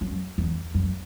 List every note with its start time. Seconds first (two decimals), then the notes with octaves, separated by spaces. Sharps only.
0.01 F#2
0.38 E2
0.74 F#2